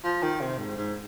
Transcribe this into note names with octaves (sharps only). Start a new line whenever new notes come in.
F3
D#3
C3
G#2
G#2